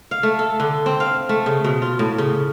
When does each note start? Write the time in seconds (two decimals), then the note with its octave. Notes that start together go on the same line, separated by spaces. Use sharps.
0.11 F5
0.23 A3
0.39 A4
0.60 D3
0.86 C4
1.00 F5
1.29 A3
1.46 C#3
1.64 B2
1.82 F4
1.99 A2
2.18 C#3